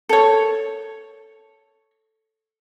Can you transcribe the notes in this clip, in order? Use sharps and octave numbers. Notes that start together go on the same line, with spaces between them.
A4 C#5